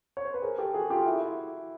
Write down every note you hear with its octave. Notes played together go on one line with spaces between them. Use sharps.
C#5
C5
B4
G#4 A#4
G4 A4
F#4 G#4
F4 G4
E4 F#4
E4